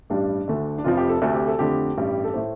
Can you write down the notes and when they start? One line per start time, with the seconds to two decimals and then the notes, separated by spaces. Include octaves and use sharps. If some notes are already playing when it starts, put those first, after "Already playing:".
0.10 A1 G2 G3 D4
0.48 D2 D3 A3
0.78 D4
0.84 F1 F2 F3 F4
0.97 G4
1.09 A4
1.22 D2 C3 A3 A4
1.35 G4
1.48 A4
1.59 F2 D3 A3 G4
1.97 A1 G2 G3
2.24 A4
2.34 A2 A3 C5